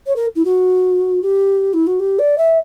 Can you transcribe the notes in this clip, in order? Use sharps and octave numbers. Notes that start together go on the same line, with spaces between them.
C#5
A#4
E4
F#4
G4
E4
F#4
G4
D5
E5